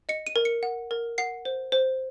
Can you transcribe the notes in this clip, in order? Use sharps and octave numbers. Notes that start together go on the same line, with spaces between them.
D#5 C#7
D#7
A#4
C#7
F#5
A#4
F#5 C7
C5
C5